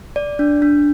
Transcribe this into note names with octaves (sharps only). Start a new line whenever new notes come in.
D5
D4
D4